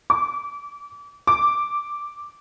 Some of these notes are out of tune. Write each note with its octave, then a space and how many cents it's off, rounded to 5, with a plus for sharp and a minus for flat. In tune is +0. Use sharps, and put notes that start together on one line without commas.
D6 -30
D6 -5